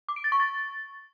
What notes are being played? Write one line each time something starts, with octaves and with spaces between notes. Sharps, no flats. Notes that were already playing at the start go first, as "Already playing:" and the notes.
D6
D7
A6
C#6
A6